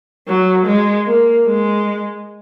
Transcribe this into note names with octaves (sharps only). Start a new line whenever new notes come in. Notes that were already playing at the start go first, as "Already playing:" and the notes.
F#3
G#3
A#3
G#3